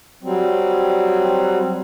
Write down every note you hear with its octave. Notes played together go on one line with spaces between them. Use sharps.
F#3 G3 C4